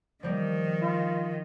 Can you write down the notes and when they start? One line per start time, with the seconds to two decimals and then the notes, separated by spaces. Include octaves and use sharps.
0.23 D#3 F3 G3 A#3
0.82 F4